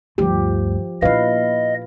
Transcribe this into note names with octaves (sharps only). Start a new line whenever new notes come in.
D2 G2 F3 G4
A#2 D4 E4 B4 D#5 F5